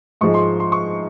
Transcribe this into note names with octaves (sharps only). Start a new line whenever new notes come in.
G#2 F3 G#3 C#6
C6
C6
C#6